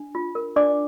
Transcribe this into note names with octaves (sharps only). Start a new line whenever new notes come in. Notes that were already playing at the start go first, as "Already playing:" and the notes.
Already playing: D4
F4
A#4
D4 D5 D6